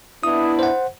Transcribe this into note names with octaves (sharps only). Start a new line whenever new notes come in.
B3 D4 E4 D#6
C5 F#5